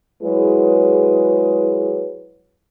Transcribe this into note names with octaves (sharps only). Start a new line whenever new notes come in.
F#3 G#3 E4 G#4 B4 C#5